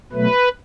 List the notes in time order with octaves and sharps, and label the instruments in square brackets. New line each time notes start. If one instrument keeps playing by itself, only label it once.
[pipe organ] B2 F#3 A3 B4